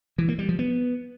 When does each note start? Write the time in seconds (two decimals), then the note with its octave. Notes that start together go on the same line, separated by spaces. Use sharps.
0.18 E3
0.29 A#3
0.39 G3
0.49 F3
0.59 B3